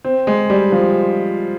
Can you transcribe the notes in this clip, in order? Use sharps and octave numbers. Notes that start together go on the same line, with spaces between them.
C4
G#3
G3
F3